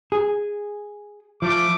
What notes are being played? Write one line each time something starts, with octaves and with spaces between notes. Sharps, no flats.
G#4
F3 A3 D6